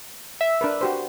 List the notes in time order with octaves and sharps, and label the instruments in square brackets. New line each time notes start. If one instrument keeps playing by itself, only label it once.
[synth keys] E5
[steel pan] D4 A#4 B4
F#4 G4 C5